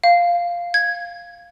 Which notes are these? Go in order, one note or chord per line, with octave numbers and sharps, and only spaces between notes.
F5
G#6